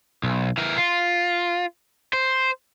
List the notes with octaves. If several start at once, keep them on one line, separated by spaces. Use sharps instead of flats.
B1
E3 A#4
F4
C5